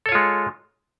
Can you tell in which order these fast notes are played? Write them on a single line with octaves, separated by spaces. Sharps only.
A4 C#5 F4 G#3